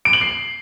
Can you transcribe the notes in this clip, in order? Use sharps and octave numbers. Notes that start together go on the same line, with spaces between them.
D7
F#7
C7